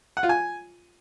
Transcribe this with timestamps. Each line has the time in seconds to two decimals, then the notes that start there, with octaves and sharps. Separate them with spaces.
0.17 F#5
0.23 F4
0.29 G#5